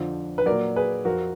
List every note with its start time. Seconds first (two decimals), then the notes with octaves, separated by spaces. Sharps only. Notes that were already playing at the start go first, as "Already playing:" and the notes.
Already playing: F2 D3 F3
0.38 B4
0.46 A#2 F#3 A#4 D5
0.76 G#4 B4
1.05 F2 F3 F#4 A#4